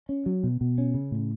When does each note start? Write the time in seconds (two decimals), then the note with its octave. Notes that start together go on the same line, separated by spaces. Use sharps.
0.09 C#4
0.26 F#3
0.43 B2
0.61 B2
0.78 C#4
0.94 C#3
1.11 A2